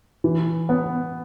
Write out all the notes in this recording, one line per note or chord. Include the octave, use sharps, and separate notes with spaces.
E3
B3